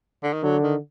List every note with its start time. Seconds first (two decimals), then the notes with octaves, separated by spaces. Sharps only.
0.23 D3
0.33 D#3
0.43 D3 F#3
0.62 D#3